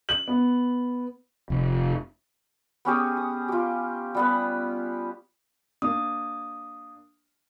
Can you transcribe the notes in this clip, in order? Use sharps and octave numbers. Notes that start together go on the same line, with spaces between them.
F#7
B3
F1
B3 C#4 G4 G#4
D#6
F4 G4
G3 B3 B4
A#3 D4 D#6